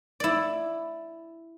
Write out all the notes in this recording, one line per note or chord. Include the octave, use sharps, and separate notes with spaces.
E4 D5